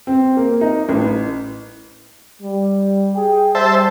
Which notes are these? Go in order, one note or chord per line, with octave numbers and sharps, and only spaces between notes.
C4
A#3
D#4
A1
G3
G#4 G5
G3 C5 E5 A5